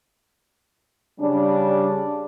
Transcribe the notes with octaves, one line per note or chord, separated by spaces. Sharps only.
C#3 G3 D4